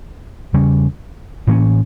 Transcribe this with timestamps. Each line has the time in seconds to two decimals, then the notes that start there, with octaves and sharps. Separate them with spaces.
0.53 E2 C#3 G3 C#4
1.47 A2 E3 A#3 C#4